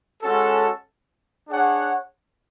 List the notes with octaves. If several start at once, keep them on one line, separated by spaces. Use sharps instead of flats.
G#3 C#4 F#4 A4
D4 G#4 C#5 F#5